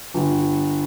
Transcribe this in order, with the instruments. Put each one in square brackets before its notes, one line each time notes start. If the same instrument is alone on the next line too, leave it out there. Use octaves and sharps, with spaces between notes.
[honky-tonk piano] G1